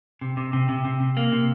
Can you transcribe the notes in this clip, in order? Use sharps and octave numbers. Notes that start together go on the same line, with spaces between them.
C3
C3
C3
C3
C3
C3
A#3
C3